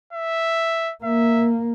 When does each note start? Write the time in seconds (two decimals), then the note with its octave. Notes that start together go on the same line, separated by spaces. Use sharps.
0.13 E5
1.04 A#3 E5